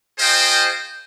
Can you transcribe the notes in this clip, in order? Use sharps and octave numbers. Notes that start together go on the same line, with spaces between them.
F4 G#4 C5 D#5 G5